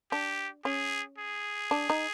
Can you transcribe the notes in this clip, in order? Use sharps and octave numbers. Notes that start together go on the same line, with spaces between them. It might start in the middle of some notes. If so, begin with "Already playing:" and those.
D4 G4
C#4 G#4
G#4
D4
D#4